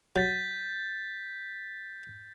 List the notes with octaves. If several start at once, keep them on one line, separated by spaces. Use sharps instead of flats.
F#3 G6 A6 B6